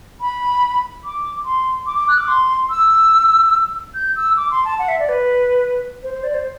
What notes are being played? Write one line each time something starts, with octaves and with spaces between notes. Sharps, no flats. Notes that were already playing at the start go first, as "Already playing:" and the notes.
B5
D6
C6
D6
D6
F#6
D6
C6
E6
G6
E6
D6
C6
A5
F#5
E5
D5
B4
C5
C5
D5
C5